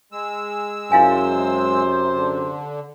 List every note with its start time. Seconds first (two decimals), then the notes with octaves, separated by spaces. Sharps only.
0.12 G#3 E6
0.92 F#2 C3 E4 C5 F5 G#5
2.15 D3